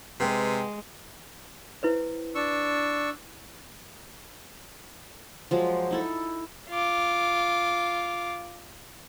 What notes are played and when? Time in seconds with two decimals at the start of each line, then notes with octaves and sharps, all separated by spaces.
0.20 C3 G#3 B4 G5
1.83 E4 B4 C5
2.35 D4 C#6 E6
5.51 F3 F#3 G#3
5.91 D#4 E4 A4
6.70 F4 D6